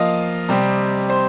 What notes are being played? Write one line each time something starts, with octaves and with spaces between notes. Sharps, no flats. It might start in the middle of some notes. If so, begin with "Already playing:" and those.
Already playing: F3 A#3 F4 D#5 F5
C3 G3 C4
C5